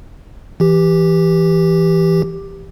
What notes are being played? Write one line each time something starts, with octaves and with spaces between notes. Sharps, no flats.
E3 G4